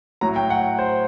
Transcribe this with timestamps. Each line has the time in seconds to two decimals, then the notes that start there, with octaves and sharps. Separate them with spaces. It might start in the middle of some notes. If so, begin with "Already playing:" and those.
0.21 A2 F#3 A#5
0.36 G5
0.50 F#5
0.79 C5